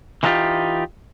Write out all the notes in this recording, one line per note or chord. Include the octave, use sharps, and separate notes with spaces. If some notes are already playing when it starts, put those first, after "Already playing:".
E3 G#3 A#3 D#4 F4 G4